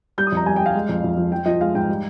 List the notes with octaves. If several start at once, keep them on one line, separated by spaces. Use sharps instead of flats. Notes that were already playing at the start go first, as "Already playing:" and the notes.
G3 G6
D#6
F2 A#5
G3 G#5
G5
G3 F5
G#3
F2
F2
F3
F3 G5
F3 D#5
G#3 F5
G#2 G5
G3